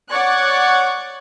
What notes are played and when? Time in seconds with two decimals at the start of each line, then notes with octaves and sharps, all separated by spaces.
0.11 C#5 D5 F#5 C#6 F#6 G#6